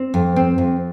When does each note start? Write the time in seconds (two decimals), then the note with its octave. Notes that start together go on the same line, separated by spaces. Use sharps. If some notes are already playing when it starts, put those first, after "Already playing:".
Already playing: C4
0.14 F2
0.36 C4
0.58 F2